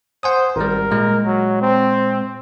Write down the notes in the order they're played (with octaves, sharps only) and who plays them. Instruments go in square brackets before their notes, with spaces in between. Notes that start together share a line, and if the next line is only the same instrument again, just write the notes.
[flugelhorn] C5 [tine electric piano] F#5 G#5 D#6
[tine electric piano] G#1 G3 [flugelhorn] A#4
[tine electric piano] A#2 G#3
[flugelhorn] F#3
C4